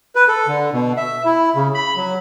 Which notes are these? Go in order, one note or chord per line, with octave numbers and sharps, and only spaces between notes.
B4
A4
D3
B2
E5
E4
C#3
B5
F#3